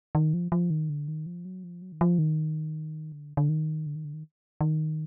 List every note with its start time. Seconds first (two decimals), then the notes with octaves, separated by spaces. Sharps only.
0.15 D#3
0.34 F3
0.52 F3
0.70 D#3
0.90 D3
1.08 D#3
1.26 F3
1.45 F#3
1.64 F3
1.82 F#3
1.92 D#3
2.01 F3
2.19 D#3
3.12 D3
3.37 D3
3.49 D#3
3.86 D3
3.95 D#3
4.05 D3
4.14 D#3
4.61 D#3